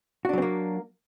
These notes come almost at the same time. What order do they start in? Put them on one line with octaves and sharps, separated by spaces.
F#4 D4 F#3 C4 A#3